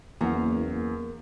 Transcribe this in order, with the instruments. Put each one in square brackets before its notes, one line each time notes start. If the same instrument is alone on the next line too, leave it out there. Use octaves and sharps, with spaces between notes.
[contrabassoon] F#1 [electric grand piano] E2 [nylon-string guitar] A#3 F#5